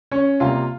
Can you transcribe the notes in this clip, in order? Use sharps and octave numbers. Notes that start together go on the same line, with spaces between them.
C#4 C#5
C3 G3 A#3 F4 F5